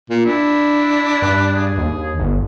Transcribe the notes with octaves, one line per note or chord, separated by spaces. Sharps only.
A#2
D4 E4
G2 B4
G#4
D#2
G1